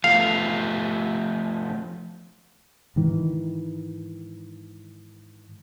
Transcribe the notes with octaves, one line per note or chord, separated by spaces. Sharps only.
F3 A3 B3 F5
G#2 D#3 E3